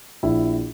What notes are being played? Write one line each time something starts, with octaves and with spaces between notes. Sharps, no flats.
A#1 E4